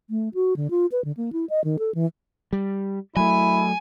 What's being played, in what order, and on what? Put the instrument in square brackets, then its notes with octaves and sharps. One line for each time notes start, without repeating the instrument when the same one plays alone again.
[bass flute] A3
F#4
D3
F4
B4
D3
A#3
E4
D#5
D#3
A4
E3
[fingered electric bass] G3
[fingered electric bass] F#3 A3 [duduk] E4 [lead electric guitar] G#5